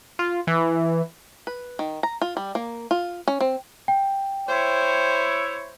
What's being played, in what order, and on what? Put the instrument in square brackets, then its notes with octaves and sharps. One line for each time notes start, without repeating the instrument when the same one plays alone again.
[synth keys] F4
E3
[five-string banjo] B4
D#3
A#5
F4
G3
A#3
F4
C#4
C4
[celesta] G5
[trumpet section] E4 C#5 [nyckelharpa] C5